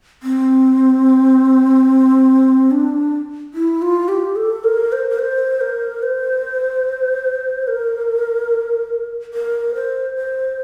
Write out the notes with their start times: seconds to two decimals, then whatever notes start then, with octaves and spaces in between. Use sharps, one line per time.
0.23 C4
2.71 D4
3.54 E4
3.82 F4
4.08 G4
4.36 A4
4.64 A#4
4.92 C5
5.10 A#4
5.19 C5
5.61 A#4
6.03 C5
7.68 A#4
9.34 A#4
9.75 C5
10.16 C5